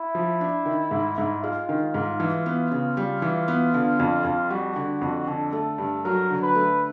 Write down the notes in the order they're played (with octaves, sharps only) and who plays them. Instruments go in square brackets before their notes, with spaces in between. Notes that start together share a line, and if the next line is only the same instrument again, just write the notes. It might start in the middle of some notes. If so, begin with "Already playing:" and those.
Already playing: [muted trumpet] E4
[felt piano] F3
D4
D#3
G#2
G#2
[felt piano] G#3 [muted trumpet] F4
[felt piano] D#3
G#2
E3
B3
C#3
G3
E3
B3
D3
F2
F2
[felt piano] G3 [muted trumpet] F#4
[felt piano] D3
F2
[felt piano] D3 [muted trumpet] A4
[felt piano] A3
G2
[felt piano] F#3 [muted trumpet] A#4
[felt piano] D3
[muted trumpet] B4
[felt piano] A3